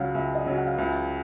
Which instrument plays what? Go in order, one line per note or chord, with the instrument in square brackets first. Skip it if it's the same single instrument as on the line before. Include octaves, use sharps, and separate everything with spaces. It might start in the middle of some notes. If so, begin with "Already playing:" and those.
Already playing: [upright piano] C#2 C#3 F#3 [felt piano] F5 F#5
[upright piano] C#2 [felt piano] E5
[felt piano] D#5
[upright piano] C#3 F#3
[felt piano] F#5
F5
[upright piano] C#2 [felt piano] E5
[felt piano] F5